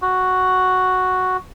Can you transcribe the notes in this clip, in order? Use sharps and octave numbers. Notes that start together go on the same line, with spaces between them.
F#4